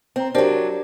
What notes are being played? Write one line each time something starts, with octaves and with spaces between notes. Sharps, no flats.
C4 G5 A#5
F#3 D4 G4 A#4 C5